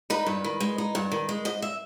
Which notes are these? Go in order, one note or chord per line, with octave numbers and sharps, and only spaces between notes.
D#4 B4
G2
D#3
G#3
D#4
G2
D#3
G#3
G#2 D#5
E5